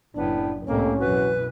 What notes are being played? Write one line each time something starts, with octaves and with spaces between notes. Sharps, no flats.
F#1 A2 B3 D4
C2 F2 A2 A3 A#3 C#4
F#2 B2 E3 F#4 B4